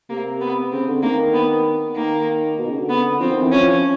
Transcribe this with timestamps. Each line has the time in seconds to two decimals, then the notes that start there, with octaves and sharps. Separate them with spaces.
0.10 C3 A#3
0.41 B3
0.72 C#3 C4
0.88 D3
1.03 D#3 A#3
1.34 B3
1.96 D#3 A#3
2.59 B2
2.69 C#3
2.80 D3
2.90 B3
3.20 F3 C4
3.31 D#3
3.42 E3
3.52 F3 C#4